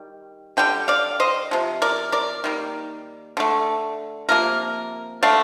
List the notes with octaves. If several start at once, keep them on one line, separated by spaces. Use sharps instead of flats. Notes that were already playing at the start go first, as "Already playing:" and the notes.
Already playing: D#3 G3
D3 G3 G5
D5 F5
C5 D#5
C3 F3
A#4 D5
A#4 D5
D#3 G3 A#3
D3 A3
C3 F3 A#3 A#4
D3 A3 D5 F5